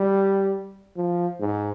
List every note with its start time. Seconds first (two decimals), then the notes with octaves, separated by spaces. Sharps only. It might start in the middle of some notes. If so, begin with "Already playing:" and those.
Already playing: G3
0.96 F3
1.40 G#2